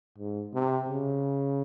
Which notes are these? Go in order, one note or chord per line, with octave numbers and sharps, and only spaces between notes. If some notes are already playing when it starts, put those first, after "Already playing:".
G#2
C3
C#3